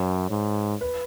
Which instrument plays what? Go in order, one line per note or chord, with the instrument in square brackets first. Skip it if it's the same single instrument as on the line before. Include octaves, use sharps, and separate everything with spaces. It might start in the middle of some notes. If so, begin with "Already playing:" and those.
Already playing: [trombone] F#2 [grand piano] C#5
[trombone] G#2
[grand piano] B4